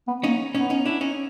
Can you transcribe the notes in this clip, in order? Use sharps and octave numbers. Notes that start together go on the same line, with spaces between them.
B3
A#3 C#4 D#4
B3 C#4 D#4
C#4 D#4
D4 E4
C#4 D#4